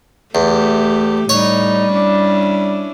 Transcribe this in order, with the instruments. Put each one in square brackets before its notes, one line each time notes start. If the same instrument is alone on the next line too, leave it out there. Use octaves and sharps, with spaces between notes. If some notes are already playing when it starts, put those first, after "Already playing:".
[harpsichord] E2 [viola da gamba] A3 G4
[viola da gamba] A2 D#4 [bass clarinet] G3 [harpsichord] C#5
[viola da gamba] C#4 D4 E4